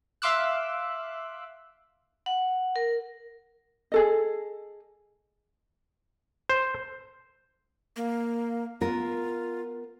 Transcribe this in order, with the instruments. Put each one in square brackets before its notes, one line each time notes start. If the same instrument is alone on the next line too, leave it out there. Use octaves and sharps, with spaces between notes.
[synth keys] E5 F5 C6 D6 E6 F#6
[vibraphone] F#5
A#4
[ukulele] G#4 A4 D#5
[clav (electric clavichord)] C5
[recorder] A#3
[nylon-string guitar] B3 A#4 [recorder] F4